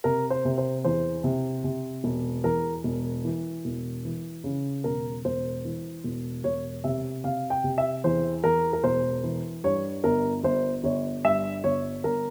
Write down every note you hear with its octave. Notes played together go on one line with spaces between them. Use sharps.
C3 A#4
C5
C3
C5
E2 C5
C3
C3
E1
E2 A#4
E1
E3
E1
E3
C#3
E1 A#4
E1 C5
E3
E1
E1 C#5
C3 E5
C3 F5
G5
C3
E5
E2 C5
E2 A#4
A#4
E1 C5
E3
G2 C#5
G1 A#4
G1 C5
G1 C#5
G2 E5
G1 C#5
G1 A#4